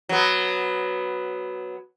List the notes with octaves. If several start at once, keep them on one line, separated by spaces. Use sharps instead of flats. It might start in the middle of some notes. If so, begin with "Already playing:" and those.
F#3 B3